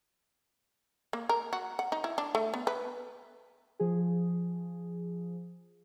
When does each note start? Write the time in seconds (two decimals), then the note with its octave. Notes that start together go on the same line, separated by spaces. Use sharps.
1.13 A#3
1.29 A#4
1.53 F#4
1.79 F#5
1.92 D#4
2.04 E4
2.18 D4
2.35 A3
2.54 B3
2.67 B4
3.80 F3 G#4